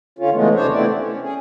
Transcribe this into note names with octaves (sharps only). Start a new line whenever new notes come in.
D3 C#4 F4
C#3 E3 G#3 A3 B3
D#2 C3 D4 C5 C#5
A3 B3 C4 E4 D5
C#4
G#4